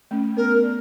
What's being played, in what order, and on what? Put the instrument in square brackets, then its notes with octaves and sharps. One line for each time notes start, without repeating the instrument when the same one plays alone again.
[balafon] A3 C#4
[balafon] B3 [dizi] A#4
[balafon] A#4 D5